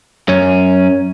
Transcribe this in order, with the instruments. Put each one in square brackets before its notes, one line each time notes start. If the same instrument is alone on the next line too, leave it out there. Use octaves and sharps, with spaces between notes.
[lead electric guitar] F#2 C#4